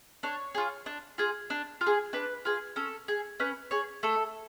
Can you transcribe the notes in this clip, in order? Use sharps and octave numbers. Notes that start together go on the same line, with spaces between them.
D4 C#5
F4 G#4
D4
F4 G#4
D4
F4
G#4
D4 B4
F4 G#4
C#4 A4
G#4
C#4 B4
G#4 C#5
A3 A4